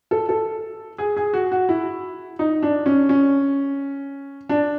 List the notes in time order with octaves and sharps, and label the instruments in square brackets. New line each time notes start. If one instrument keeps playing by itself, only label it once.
[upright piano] A4
A4
G#4
G#4
F#4
F#4
E4
D#4
D4
C#4
C#4
D4